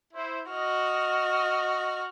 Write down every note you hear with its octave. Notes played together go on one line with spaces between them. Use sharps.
E4 C5
F#4 D#5 F6